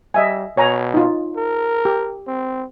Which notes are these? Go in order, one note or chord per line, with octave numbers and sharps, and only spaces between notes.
G3 D#5 E5 G#5
B2 C#5 G#5 A#5
D#4 F4
A#4
G4
C4